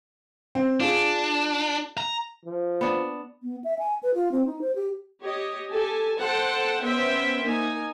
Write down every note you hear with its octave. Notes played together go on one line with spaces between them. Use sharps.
C4
D4 F4 G#4
A#5
F3
B3 D4
B3
E5
G#5
B4
F4
C4
D#4
C5
G4
G4 C#5 D#5
G4 A4 G#5 A5
A4 C5 F#5 G5 A5
B3 C#4 C5 E5 G5
A#3 D#4 G#5